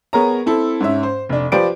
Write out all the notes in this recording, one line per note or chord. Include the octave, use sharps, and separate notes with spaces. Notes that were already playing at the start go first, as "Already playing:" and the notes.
B3 G#4 A#4 C#5 A#5
C4 E4 A4
G#2 C#4 E5
C5
F1 D4
F3 G4 B4 C5 D5 D7